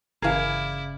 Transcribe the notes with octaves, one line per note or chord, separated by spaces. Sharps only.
G1 C#3 E3 E4 G#4 A#4 D5 F5